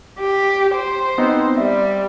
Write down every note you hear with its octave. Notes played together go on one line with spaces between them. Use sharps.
G4
C5
B3 C4 D#4
G3 E5